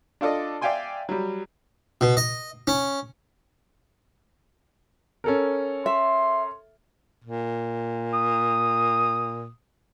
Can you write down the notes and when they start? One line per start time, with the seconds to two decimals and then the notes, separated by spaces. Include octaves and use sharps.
0.21 D4 F4 A4 D5 D#5
0.61 D5 E5 F5 G5 G#5 C6
1.09 F#3 G3
2.01 B2
2.17 D#5
2.67 C#4
5.24 C#4 A4 A#4
5.86 E5 C6
7.24 A#2
8.13 D#6